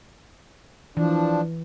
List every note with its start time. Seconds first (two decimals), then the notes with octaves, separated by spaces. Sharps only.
0.97 E3 F3 D4